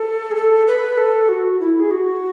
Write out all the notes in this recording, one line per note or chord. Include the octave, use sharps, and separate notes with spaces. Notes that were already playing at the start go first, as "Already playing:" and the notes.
Already playing: A4
G#4
A4
B4
A4
F#4
E4
G#4
F#4